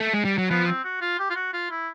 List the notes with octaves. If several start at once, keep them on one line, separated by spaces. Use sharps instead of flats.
A3
G#3
G3
F#3
F3 B3
C4
F#4
F4
G4
F4
F#4
F4
E4